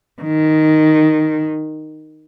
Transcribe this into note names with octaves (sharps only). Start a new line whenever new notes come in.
D#3